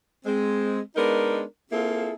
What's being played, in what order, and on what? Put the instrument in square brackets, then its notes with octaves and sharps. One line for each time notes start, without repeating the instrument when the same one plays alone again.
[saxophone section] G#3 C4
G#3 B3 D4 D#4 A#4
A#3 C4 E4 F4 G#4 A4